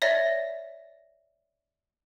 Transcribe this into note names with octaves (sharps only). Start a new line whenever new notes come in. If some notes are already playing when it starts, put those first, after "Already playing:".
C#5 D5 E5 A6 A#6